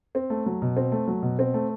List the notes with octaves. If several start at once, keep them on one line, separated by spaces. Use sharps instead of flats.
C4
A3
F#3
B2
C4
A3
F#3
B2
C4
A3